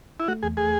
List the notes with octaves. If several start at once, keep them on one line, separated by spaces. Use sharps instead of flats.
E4
A3 F#4
E2 G#4
A3 G#4